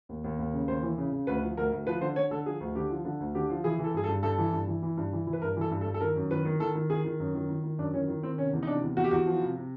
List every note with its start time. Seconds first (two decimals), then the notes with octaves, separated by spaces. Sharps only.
0.09 D#2
0.24 D#2
0.39 D#2
0.53 C#3
0.68 D#2 C5
0.83 E3
0.98 C#3
1.12 C#3
1.27 D2 B4
1.42 F3
1.57 D2 A#4
1.72 D2
1.86 F3 B4
2.01 D3 C5
2.16 D3 C#5
2.31 D3 A4
2.46 F3 G#4
2.60 D2
2.75 D3 G4
2.90 F3
3.05 D3
3.20 D2
3.35 D3 G4
3.49 F3
3.64 E3 G#4
3.79 E3
3.84 A4
3.94 G2 G#4
4.04 A4
4.08 G2
4.23 G2 A4
4.38 E3
4.53 G2
4.68 E3
4.82 E3
4.97 G2
5.13 E3
5.27 E3
5.33 B4
5.42 G2 A#4
5.56 E3 A4
5.71 G2
5.81 A4
5.86 G2
5.94 A4
6.01 D#3 A#4
6.16 F#2
6.30 D#3 B4
6.45 D#3
6.60 D#3 A4
6.75 D#3
6.90 D#3 G#4
7.04 D#3
7.20 F#2
7.34 D#3
7.49 D#3
7.64 D#3
7.78 F#2 D4
7.94 D#3 C#4
8.08 D#3
8.23 D#3 C4
8.38 C3 C#4
8.53 E2
8.63 D#4
8.67 C3 D4
8.82 E2
8.97 E2 F#4
9.04 G4
9.11 E2 F#4
9.26 F3
9.42 C3
9.57 C3